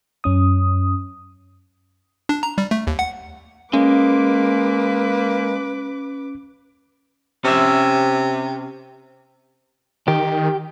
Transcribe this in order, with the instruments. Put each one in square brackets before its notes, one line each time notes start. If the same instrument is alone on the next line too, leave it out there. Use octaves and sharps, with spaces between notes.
[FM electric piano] F#2 C#4 D#6
[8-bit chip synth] D4
A#5
G3
A3
D#2
F#5
[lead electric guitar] G#3 [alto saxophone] A#3 [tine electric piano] C#4 [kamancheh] B4 D6
[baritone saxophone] C3 [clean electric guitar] C#4 E5
[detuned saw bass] D#3 [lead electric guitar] G4